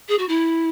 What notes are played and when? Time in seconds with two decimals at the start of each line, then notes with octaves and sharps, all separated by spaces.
0.08 G#4
0.18 F#4
0.28 E4